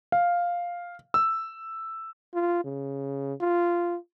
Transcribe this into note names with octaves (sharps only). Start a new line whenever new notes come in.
F5
E6
F4
C#3
F4